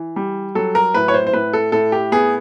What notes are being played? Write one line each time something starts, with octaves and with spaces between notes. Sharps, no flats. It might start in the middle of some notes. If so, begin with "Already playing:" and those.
Already playing: E3
G3
F#3 A4
A#4
A2 B4
C#5
C5
C5
A2 B4
A4
A2 A4
G4
B3 G#4